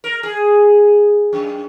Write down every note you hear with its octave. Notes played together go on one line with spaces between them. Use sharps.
A#4
G#4
F#2